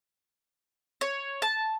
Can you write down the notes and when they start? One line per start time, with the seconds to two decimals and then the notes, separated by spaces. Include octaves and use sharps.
1.01 C#5
1.42 A5